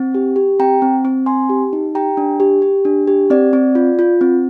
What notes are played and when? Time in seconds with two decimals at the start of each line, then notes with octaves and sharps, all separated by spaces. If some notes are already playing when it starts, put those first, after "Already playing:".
Already playing: C4
0.15 G4
0.36 G4
0.59 C4 G5 A#5
0.82 C4
1.05 C4
1.26 C4 G#5 C6
1.50 G4
1.73 D#4
1.95 G4 G5 A#5
2.17 D4
2.40 G4
2.62 G4
2.85 D4
3.07 G4
3.30 C4 D5
3.53 C4
3.75 F4
3.99 F4
4.21 C4